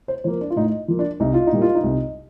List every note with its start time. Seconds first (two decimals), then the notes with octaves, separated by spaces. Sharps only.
0.08 C5
0.24 F3 A#3 C5
0.41 D4
0.50 F4
0.56 A2 D#4
0.88 F3 A#3
0.99 D4
1.20 C2 D#4
1.34 F4
1.47 D#4
1.52 A#2 G3 A#3
1.62 F4
1.75 D#4
1.83 C2